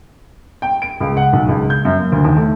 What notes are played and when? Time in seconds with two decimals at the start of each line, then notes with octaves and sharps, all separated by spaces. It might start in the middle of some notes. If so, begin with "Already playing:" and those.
0.62 G5
0.82 D7
1.00 C#2
1.17 F#5
1.33 B1
1.49 C#2
1.70 G6
1.85 F#2
1.99 A#3
2.12 D2
2.24 D#2
2.37 A3